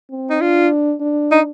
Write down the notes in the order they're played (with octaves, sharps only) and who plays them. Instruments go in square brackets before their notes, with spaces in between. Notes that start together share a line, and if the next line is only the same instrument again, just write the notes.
[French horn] C4
[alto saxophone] D#4
[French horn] D4 [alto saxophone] F4
[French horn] D4
[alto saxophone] D#4